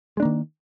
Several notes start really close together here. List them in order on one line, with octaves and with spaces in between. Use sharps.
G#3 D4 A#3 D#3